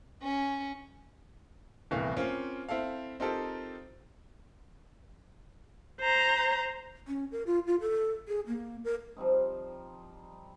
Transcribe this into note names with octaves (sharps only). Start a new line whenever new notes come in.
C#4
D#1 C2 E3 A3 B3 F5
A#3 C4 C#4 F4
C4 E4 A4 F5
C4 D#4 F4 G4 A4 A#4
C5 A#5
C#4
A#4
F4
F4
A4
G#4
A#3
A#4
F3 G3 C4 D#4